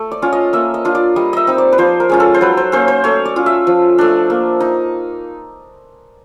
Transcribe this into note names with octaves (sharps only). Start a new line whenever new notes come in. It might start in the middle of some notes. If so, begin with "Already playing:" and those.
Already playing: A3
D5
C#4 F4
D#5
A#3 E5
D#5
D4 F4
D5
G3 D#5
D#5 E5
C4 D#4
D5
B4
F3 C5
A#4
G#3 C#4 F4
A4
C5
F#3 B4
C5
A#3 C#4 C5
C5
A3 C#5
D5
C#4 F4
E5
F3
A3 D4
A#3
D#4